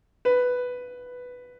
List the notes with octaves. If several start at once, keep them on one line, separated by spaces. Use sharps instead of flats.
B4